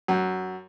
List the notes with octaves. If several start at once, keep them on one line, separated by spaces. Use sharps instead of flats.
F#2